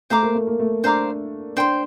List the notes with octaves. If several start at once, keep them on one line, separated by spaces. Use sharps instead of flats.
A3 C5 F5 A#5 D6
A#3
A3
A#3
A3
D4 C5 F5 A#5 D6
D4 C5 G5 C6